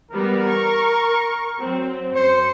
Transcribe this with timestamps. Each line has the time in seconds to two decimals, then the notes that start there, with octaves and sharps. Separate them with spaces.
0.11 E3 G3 B3 A#4
0.48 C#6
1.60 F#3 C4
2.16 F#2 C5 C#7